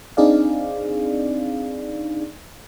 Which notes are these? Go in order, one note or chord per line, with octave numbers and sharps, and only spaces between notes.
C4 D4 D#4 G#4 D5 F5